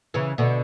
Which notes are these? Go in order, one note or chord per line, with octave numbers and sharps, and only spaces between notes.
C#3 E3
B2 D3